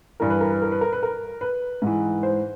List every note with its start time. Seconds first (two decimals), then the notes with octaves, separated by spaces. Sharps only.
0.20 G2 E3 A#4
0.30 B4
0.41 A#4
0.50 B4
0.62 A#4
0.72 B4
0.81 A#4
0.93 B4
1.03 A#4
1.41 B4
1.82 G#2 E3
2.23 C5